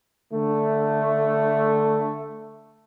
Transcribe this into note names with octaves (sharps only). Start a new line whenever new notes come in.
D3 A3